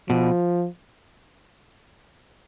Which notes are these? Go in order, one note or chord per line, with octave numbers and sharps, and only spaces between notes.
B2 F3